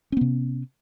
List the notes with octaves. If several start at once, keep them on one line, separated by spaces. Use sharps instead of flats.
C3 B3 C#4